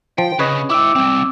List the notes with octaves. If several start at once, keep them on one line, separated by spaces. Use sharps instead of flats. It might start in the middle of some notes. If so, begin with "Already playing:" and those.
F3 G5
C#3 B4 C#5 D#5
E4 G5 D6 E6
G3 C4